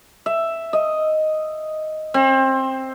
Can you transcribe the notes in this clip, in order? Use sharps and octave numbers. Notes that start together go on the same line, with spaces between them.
E5
D#5
C4